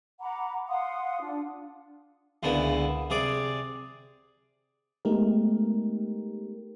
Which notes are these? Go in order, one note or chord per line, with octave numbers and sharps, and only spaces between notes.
F#5 A#5 B5 D6
F5 F#5 C6 D#6
D4 F4
C#2 A#2 D3 B3 E4 F#5
C3 G#4 D5 D6
G#3 A3 B3 D#4 G4 A#4